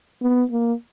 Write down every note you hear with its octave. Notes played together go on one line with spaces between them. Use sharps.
B3
A#3